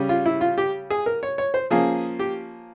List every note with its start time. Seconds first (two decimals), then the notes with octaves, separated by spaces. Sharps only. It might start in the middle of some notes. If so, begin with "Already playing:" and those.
Already playing: C#3 G3 C#4
0.09 F4
0.26 E4
0.41 F4
0.58 G4
0.90 G#4
1.06 A#4
1.23 C#5
1.38 C#5
1.54 C5
1.70 F3 A#3 C#4 G#4
2.19 G4